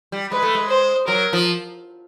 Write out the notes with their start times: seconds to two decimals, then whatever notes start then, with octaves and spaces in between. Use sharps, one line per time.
0.12 G3
0.32 G#3 B4
0.42 A3
0.55 G#3
0.69 C5
1.07 F#3 A#4
1.33 F3